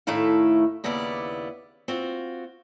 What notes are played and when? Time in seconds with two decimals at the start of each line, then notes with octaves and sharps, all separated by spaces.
0.07 A2 D#3 A3 E4 F5
0.84 D#2 C#3 B3 E4 D5
1.88 C4 F4 F#4